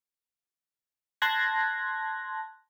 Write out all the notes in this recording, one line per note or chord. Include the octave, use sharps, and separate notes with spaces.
A5 C6 F#6 G#6 A#6